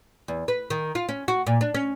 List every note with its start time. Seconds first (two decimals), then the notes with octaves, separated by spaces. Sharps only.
0.28 E2
0.48 B4
0.70 D#3
0.95 F4
1.09 C#4
1.28 F#4
1.47 A#2
1.61 D4
1.74 C#4